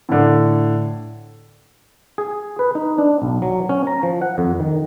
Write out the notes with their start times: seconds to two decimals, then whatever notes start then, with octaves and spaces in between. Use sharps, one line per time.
0.09 A2 D3
2.18 G#4
2.59 B4
2.75 D#4
2.98 D4
3.22 B1
3.42 F#3
3.69 C#4
3.87 A#5
4.03 F3
4.22 F#5
4.38 F2
4.60 D#3